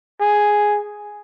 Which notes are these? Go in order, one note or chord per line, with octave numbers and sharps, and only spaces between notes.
G#4